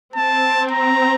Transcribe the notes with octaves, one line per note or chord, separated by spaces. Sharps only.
C4 A5
A#5